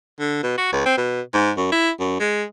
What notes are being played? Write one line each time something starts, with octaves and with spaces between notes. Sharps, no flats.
D3
B2
F#4
C#2
C4
B2
G#2
F#2
E4
F#2
G#3